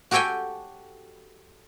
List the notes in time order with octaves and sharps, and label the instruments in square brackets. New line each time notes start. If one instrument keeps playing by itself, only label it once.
[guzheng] F#4 G4 A4 C#5 G5 G#5